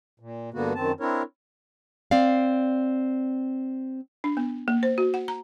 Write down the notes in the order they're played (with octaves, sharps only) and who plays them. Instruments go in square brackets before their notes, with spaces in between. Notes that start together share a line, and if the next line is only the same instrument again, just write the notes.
[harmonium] A#2
G2 D3 A#3 B3 F#4
F#2 D#3 C4 A5
C4 D4 E4 A#4 C#5
[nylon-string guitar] C4 D5 F5
[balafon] D4
B3
A#3
C5
F#4
F#5
A#5